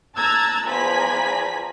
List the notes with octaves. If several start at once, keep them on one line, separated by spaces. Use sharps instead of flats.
A5 A#5 E6 F#6 G#6 A6
E2 F3 G#5 A#5 B5 B6